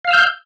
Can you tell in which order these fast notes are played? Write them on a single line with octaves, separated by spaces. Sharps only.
F5 F6 E6 G6